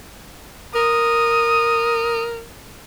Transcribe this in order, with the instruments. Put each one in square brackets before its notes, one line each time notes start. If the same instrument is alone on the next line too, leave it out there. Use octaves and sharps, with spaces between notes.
[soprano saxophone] A#4 [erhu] D#6